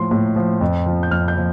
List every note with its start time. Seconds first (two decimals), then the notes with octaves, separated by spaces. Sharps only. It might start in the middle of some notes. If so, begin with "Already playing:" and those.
Already playing: A2 F3 C6
0.11 A2
0.36 F3
0.61 F2
0.86 F3
1.03 G6
1.11 F2 F6
1.28 G6
1.37 F3